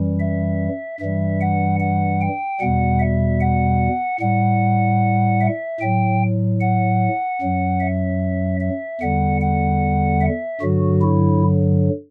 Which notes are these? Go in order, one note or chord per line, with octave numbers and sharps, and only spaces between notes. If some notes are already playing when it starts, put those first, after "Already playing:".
Already playing: F#2 E3 G3
E5
G2 E3 G3 E5
F#5
F#5
G5
E2 B2 G3 F#5
E5
F#5
A2 G3 F#5
E5
A2 F#3 G5
F#5
F#2 F#3
E5
E5
E2 D3 G3 F#5
F#5
E5
G2 D3 F#3 F#4
E4